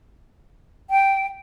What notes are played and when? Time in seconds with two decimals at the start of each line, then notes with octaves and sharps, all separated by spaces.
0.90 G5